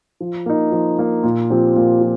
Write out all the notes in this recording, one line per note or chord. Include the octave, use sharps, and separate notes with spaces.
F3
A#3 D#4
F3
A#3 D#4
A#2
F3 C4 G4
A#2
F3